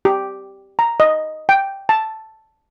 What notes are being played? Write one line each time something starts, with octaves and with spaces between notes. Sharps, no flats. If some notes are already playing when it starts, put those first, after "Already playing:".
G4
A#5
D#5
G5
A5